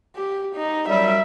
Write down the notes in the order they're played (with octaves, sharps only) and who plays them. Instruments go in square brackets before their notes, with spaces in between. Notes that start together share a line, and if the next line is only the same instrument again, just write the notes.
[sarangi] G4
D#4
[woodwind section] F#2 F#3 G3 [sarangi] E5